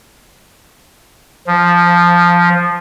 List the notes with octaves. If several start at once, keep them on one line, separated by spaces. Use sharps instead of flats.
F3